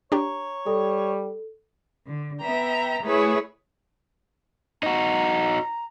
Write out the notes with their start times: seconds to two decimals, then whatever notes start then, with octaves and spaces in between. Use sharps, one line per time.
0.12 D4 G4 C#5 A#5
0.67 G3 A4
2.06 D3
2.40 B3 E5 G5 A#5
3.03 A3 E4 G#4 B4 C#5 E5
4.83 D#4 F#4 A#5